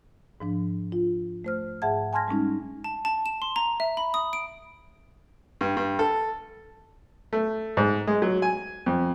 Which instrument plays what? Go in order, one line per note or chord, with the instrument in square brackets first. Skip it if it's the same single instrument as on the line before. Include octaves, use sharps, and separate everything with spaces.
[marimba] G#2 F3 D4
F4
A3 C5 F6
G#2 G#4 E5 F#5 A5 G#6
G#5 A5 C6 F6 G#6 A#6
G3 G#3 C#4 D#4
[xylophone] A5
A5
E7
C6
A#5
E5
B5
D#6
D7
[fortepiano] G2
G2
A4
A3
G#2
G#3
F#3
G#5
F2